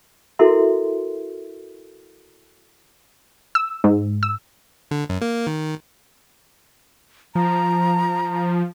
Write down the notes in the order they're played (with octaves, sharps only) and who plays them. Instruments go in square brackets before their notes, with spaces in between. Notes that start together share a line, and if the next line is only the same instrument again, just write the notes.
[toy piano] E4 F#4 A4 A#4 E5 C6
[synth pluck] E6
G#2
E6
[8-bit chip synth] D3
F#2
A#3
D#3
[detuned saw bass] F3 [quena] A#5